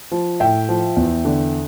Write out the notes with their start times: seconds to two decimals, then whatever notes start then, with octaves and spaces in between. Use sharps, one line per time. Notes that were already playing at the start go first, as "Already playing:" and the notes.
0.12 F3
0.40 A2 E5 G5
0.69 F3
0.97 E2
1.25 D3